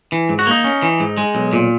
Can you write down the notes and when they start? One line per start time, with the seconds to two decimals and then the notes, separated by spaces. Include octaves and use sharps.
0.12 E3
0.29 G#2
0.39 F#4
0.47 A#3 D#4
0.64 C#4
0.82 E3
1.00 G#2
1.17 G#3
1.35 B1
1.53 A#2